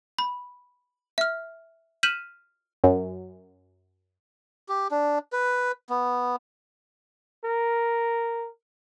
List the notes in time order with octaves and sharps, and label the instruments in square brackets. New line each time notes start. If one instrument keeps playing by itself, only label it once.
[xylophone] B5
E5 F6
F6 G6 B6 D#7 E7 F#7
[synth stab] F#2
[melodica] G4
D4
B4
B3
[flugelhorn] A#4